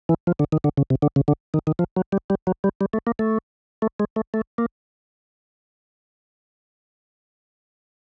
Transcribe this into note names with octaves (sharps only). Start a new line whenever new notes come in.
E3
F3
D3
D#3
D3
C#3
C3
D3
C#3
D3
D#3
D#3
F3
F#3
G3
G3
F#3
G3
G3
A3
A#3
A3
A3
G#3
A3
A3
A#3